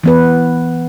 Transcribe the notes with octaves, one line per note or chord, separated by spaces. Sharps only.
E3 B3 B4